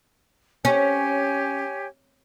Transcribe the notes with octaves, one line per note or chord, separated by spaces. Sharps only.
C#4 G4 C#5 G#5